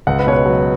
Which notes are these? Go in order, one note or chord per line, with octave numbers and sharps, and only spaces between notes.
C#2 F#5
B4
B2 C#5
B4
F#3